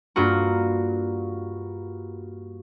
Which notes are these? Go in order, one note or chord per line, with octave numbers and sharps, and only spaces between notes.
G2 A#3 F4 F#4